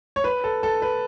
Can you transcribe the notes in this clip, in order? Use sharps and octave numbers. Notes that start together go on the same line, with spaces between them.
C#5
B4
A4
A4
B4